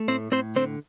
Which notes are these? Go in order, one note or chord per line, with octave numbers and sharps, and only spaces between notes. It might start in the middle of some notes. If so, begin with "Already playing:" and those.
Already playing: A3
A2 C4 C5
A2 C4 C5
D3 C4 C5